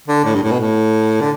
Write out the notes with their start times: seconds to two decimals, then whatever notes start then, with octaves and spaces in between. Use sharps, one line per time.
0.08 D3
0.25 A2
0.35 G2
0.43 A2
0.51 B2
0.60 A2
1.21 D3